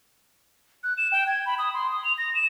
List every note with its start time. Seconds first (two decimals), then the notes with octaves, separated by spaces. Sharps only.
0.83 F#6
0.98 E7
1.12 G5
1.27 G#6
1.46 B5
1.59 D#6
1.74 C6
1.92 D#6
2.04 F7
2.18 A#6
2.35 E7